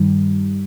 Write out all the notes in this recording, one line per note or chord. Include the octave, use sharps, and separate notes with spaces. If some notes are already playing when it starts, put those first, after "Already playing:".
Already playing: G2 D#3 G3